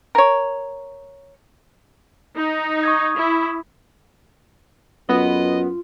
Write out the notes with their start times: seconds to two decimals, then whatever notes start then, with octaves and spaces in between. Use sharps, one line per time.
0.15 A#4 C#5
2.37 D#4
2.83 C#6 D#6 G#6
3.17 E4
5.09 F#2 B3 F4 A4 B4 D#5